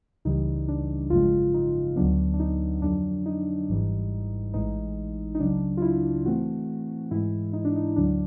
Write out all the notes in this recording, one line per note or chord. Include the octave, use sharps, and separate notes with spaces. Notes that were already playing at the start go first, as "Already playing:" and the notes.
C#2 C#3 E3 G3 D#4
D4
G#1 F#2 C#3 F3 G#3 F4
D#4
D2 D3 F#3 B3 D4
D4
D#4
F2 D3 F#3 D4
D#4
G#1 G#2 E3 G3
A1 A2 E3 G#3 D#4
D#4
C#2 C#3 F#3 D4
F4
E4
A2 E3 A3 C4 F#4
G#2 E3 G#3 E4
D#4
D4
D#4
D2 D3 F#3 D4